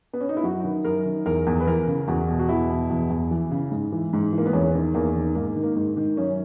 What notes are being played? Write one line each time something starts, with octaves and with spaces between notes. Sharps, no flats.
B3
C#4
D#4
E4
F#2 F#4
D#3
F#2 A#4
D#3
E2 A#4
E2
B4
E3 A#4
C#3
E2 F#4
B2
F#4
E2 E4
B2
E2
E2
E3
C#3
G#2
E3
G#2
E3 A#3
B3
E2 C#4
D#3
E2 A#3
D#3
G#2 A#3
D#3
A#3
G#2
D#3
F#2 C#4